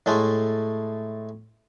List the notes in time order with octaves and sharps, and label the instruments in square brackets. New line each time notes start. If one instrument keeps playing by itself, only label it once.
[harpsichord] A2 G#3 A3